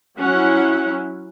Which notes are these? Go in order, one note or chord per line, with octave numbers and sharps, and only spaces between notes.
F#3 C#4 E4 F#5